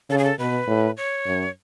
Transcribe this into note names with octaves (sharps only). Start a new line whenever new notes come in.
C#3 A4
G#4
A4
B2 B4
A2
C#5
F#2